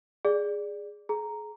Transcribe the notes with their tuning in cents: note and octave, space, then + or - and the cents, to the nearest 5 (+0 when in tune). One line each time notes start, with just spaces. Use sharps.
G#4 -10 D5 +0
G#4 +30 A#5 +0